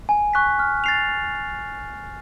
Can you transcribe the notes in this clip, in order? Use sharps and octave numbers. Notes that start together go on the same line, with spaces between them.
G#5
C#6 F#6 B6
F6
A6 C7 F7